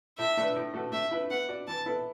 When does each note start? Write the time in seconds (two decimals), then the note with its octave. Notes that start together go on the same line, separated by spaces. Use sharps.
0.18 A2 E5
0.37 A3 D4 B4
0.56 A2
0.74 A3 F#4 A4
0.92 A3 E5
1.11 E4 B4 E5
1.30 B3 F#5
1.49 F#4 D5
1.67 E3 A5
1.86 B3 E4 A4